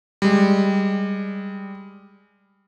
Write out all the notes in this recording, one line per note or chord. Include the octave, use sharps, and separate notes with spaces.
G3 G#3